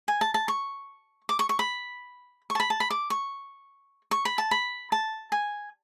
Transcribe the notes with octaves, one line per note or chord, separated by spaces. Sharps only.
G#5
A5
A5
C#6
D6
C#6
C#6
B5
C#6
A5
B5
A5
B5
D6
C#6
C#6
B5
A5
B5
A5
G#5